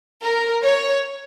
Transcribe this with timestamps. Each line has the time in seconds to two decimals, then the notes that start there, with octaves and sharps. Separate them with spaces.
0.22 A#4
0.63 C#5